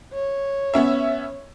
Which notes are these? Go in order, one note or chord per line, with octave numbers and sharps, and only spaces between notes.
C#5
B3 C#4 E5